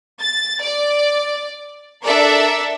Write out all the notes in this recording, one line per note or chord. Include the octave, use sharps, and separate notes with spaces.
A6
D5
D4 A4 A#4 D5 E5